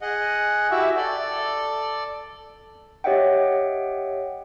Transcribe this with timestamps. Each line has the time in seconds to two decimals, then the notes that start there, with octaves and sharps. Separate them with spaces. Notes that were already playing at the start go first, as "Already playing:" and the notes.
0.01 G#4 D#5 F#5
0.71 E4 F#4 G4 E5
0.97 A4 D5
3.04 G4 C#5 D#5 E5 F#5 G5